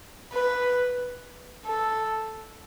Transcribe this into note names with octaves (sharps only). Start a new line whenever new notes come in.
B4
A4